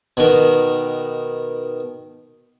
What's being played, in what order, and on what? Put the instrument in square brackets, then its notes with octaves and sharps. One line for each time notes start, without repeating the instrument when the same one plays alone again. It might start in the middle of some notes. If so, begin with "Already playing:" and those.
[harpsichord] B2 D#3